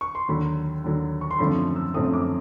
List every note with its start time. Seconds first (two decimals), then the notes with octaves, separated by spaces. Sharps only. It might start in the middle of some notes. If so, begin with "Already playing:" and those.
0.01 C#6
0.15 C6
0.28 D#2 D3 F#3 B5
0.84 D#2 D3 F#3
1.21 C#6
1.31 C6
1.39 F#2 D3 F3 A3 C4 B5
1.76 E6
1.94 F#2 D3 F3 A3 C4 D#6
2.14 D6